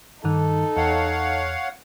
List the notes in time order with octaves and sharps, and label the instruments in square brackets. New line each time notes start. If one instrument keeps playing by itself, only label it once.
[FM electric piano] G2 D#3 [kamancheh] D#4 A4
[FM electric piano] E2 [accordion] C#5 F5 F#5